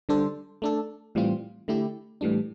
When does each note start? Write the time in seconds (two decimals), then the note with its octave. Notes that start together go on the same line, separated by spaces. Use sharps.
0.09 D3 G3 D4 A4 C5
0.62 A3 D4 A4
1.15 A2 E3 G3 C4 F4
1.68 D3 A3 E4 G4
2.21 A2 E3 G3 D4